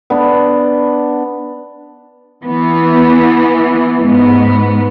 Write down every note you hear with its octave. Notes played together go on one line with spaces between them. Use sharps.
B3 D4
E3 B3
G#2 B3